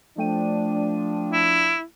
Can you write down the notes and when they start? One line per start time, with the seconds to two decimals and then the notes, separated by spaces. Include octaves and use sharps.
0.18 F3 A3 D4 G5 D#7
1.32 E4